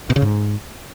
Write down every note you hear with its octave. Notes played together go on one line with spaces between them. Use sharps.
B2
C#3
G#2